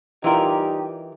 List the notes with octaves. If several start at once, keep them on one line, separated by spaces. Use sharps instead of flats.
E3 G3 D#4 F4 G4 A#4